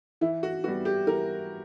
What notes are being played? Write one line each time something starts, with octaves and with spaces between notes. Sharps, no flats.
E3 E4
F#4
G3 B3 F#4
G4
E3 A#4